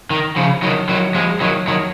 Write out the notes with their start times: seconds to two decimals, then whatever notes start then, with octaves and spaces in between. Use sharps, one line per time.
0.10 D#3
0.36 C#3 F3
0.63 D#3 F#3
0.89 D#3 F#3
1.15 F3 G#3
1.41 D#3 F#3
1.68 D#3 F#3